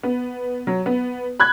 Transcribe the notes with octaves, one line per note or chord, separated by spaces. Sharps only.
B3
F#3
B3
B5 F#6 G#6